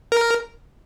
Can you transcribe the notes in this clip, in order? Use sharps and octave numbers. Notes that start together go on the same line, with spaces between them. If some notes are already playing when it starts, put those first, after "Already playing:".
A#4